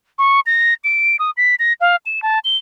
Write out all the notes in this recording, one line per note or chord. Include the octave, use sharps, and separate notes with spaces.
C#6
A#6
D7
D#6
B6
A#6
F5
E7
A5
G7